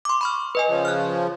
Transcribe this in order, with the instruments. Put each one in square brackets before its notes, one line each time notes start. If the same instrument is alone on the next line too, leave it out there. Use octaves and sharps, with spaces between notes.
[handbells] C6 D6
B5 C#6 F6
B4 D#5 G#5
[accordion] C#3 F3
[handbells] F6 F#6